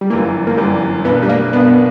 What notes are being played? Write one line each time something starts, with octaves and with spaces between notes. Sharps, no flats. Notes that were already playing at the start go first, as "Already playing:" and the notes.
G3
G1 F#2 E3 A#3
A#3
G1 F#2 E3 G3
B1 B2 A#3 B3 D4
G3
A#3
B1 B2 A#3 B3 D4